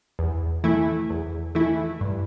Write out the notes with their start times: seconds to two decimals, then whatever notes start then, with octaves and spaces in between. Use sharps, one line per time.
0.19 E2
0.64 E3 A3 E4
1.10 E2
1.55 E3 A3 E4
2.01 G2